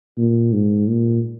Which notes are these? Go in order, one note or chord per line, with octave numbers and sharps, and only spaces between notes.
A#2
G#2
A#2